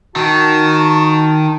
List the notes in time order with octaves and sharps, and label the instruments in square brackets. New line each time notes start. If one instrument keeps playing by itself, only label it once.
[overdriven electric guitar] D#3 [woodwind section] F#4 A5